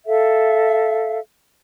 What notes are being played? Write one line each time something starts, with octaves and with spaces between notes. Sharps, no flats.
A4 E5 F5